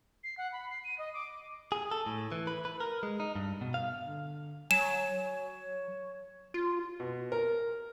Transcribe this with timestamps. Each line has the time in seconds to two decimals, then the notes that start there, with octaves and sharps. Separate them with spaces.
0.24 C7
0.38 F#5
0.52 B5
0.70 C7
0.84 D#7
0.99 D#5
1.14 D6
1.72 G#4
1.91 A4
2.06 A2
2.32 E3
2.47 B4
2.65 B4
2.80 A#4
3.03 G#3
3.20 D#4
3.36 G2
3.61 B2
3.74 F5
4.06 D3
4.71 F#3 G#5 E7
5.26 C#5
6.54 F4
7.00 B2
7.32 A#4